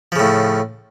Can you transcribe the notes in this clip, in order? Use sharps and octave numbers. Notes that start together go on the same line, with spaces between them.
A2 C#3 F3